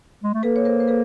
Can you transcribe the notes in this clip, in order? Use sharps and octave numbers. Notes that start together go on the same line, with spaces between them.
G#3
A3
A#3 A4 B4
C#5
A#4 C5
C5
A4 B4